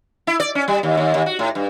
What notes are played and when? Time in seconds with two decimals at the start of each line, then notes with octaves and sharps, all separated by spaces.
0.27 E4
0.40 D5
0.55 C#4
0.68 G3
0.83 D#2
0.97 D#2
1.14 D#2
1.26 F#4
1.39 A2
1.55 G2